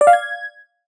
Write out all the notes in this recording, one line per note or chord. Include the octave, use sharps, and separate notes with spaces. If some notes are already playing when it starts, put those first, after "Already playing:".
D5
F5
G#6